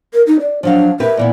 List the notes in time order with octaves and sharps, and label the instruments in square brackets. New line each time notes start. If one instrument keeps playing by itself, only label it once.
[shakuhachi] A#4
D#4
D5
[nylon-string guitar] F3 F#3 F5 [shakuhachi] D4
[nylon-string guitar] G4 A#4 B4 [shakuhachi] E5
[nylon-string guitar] A#2 E3 B3